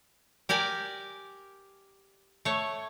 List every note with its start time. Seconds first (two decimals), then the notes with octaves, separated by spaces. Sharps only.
0.49 G4 A#4 D5 G#5
2.45 A3 C#5